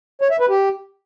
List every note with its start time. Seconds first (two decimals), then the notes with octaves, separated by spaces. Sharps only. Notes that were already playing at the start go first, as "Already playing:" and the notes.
0.21 C#5
0.31 E5
0.40 B4
0.49 G4